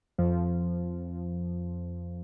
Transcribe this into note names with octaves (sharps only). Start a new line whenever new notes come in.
F2 F3